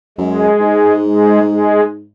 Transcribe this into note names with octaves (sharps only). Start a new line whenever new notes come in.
F#2 G#3
G#2
G#3
G#3